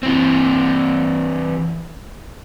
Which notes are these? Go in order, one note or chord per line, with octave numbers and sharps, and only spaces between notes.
E3 C4